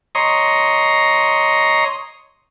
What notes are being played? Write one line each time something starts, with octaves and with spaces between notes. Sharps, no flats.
C#5 D#5 A#5 C6